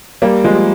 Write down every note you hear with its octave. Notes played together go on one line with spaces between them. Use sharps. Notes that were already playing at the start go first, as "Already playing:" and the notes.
G3 A#3
F3 G#3